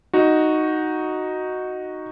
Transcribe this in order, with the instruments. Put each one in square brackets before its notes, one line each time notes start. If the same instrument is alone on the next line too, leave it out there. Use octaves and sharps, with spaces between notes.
[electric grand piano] D#4 F#4